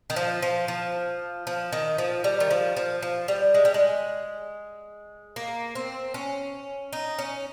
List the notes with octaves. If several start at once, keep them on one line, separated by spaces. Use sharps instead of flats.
D#3
F3
F3
F3
F3
D#3
F3
G3
D#3
F3
F3
F3
G3
G#3
G3
G#3
A#3
C4
C#4
D#4
C#4